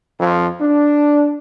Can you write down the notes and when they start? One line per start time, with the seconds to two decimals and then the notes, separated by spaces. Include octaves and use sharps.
0.19 F2
0.61 D4